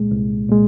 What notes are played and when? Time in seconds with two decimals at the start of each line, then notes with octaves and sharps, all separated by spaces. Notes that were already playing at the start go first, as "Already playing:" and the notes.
Already playing: C2 A#2 G#3
0.12 C2
0.49 A#2 G#3